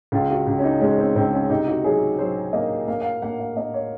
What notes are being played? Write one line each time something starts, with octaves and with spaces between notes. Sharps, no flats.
C#2 F4
F#4
C#2
C#4
D#4
G#3 C#4
C4
C#2 C4
C#4
C3 D#4
F#4
F#3 G#4
F#3 C5
A#3 D#5
A#3 F5
F5
F#5
A#3 F#5
F5
A#3 D#5
C#5